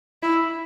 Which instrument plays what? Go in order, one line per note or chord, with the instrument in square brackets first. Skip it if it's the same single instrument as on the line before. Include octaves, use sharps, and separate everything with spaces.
[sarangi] E4